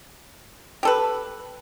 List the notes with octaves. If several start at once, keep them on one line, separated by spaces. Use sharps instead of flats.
G4 A4 B4